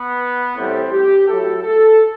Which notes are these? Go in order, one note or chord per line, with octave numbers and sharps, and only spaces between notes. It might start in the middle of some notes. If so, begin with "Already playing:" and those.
Already playing: B3
A2 E3 G3 C4
G4
A2 F#3 A4
A4